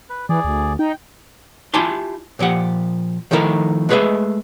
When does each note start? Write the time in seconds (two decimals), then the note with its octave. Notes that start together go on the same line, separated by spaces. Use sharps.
0.10 B4
0.29 E3 G#4 D5
0.45 D2
0.79 D#4 G5
1.74 E4 F4 G4 G#5 A5 C6
2.39 A#2 F3 G4 F#5
3.31 D#3 F3 A3 E4 A#4
3.89 G#3 A3 G#4 B4 D#5 E5